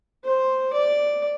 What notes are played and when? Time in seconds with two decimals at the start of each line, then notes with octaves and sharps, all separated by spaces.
0.25 C5
0.73 D5